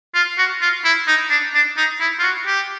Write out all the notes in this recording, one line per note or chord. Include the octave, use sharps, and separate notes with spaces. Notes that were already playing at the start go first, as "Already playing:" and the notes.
F4
F#4
F4
E4
D#4
D4
D4
D#4
E4
F4
F#4
G4